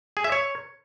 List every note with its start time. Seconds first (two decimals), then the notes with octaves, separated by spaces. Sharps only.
0.17 G#4
0.24 E5
0.32 C#5